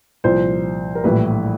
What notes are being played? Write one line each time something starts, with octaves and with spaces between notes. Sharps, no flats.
C2 A#2 F3 C5
A#4
A#1 A2 E3 G3 B4